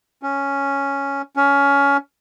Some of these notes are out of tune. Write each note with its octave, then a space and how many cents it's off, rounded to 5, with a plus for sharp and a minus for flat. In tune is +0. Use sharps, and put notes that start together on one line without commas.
C#4 +0
C#4 +20